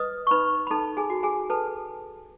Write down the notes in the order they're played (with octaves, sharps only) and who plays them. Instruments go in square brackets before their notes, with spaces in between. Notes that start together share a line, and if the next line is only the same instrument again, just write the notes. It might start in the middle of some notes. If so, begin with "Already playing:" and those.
Already playing: [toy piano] B4 D#5 D#6
C#6
D#4 B4 B5
B5
D#4 A4 A5
G#4 G#5
F#4
G#4 G#5
A4 B4 A5